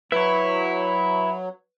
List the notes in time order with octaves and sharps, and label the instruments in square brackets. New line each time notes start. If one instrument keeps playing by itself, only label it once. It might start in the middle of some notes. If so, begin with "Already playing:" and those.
[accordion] F#3 [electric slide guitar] E4 [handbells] B4 [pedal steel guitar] C#5 E5